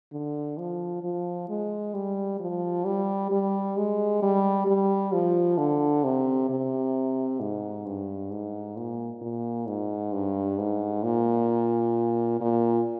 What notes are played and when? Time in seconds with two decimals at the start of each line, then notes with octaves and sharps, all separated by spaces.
0.12 D3
0.59 F3
1.03 F3
1.49 G#3
1.94 G3
2.40 F3
2.86 G3
3.31 G3
3.77 G#3
4.22 G3
4.67 G3
5.13 F3
5.58 D3
6.04 C3
6.49 C3
7.40 G#2
7.86 G2
8.31 G#2
8.77 A#2
9.22 A#2
9.67 G#2
10.13 G2
10.58 G#2
11.04 A#2
12.41 A#2